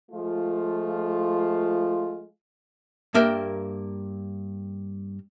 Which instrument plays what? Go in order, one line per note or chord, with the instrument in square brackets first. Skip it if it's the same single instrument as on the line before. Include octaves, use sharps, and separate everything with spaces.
[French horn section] F3 G#3 A3 F4
[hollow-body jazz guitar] G2 A#3 A#4 E5 G5